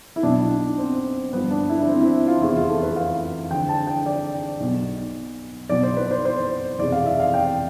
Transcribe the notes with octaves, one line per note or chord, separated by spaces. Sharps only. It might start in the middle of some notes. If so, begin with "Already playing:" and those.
E4
B1 B2 D4
C4
G1 G2 F3 B3
D4
E4
D4
C4
E4
F4
F1 E2 C3 E4
F4
A4
B4
F5
D2 D3 F3 G5
A5
G5
D5
B1 B2
B1 B2 D5
C5
B4
C5
C5
F1 E2 B2 D5
F5
E5
F5
G5